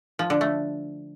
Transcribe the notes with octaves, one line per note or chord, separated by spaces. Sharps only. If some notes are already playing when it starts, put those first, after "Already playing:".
F3
D3
A3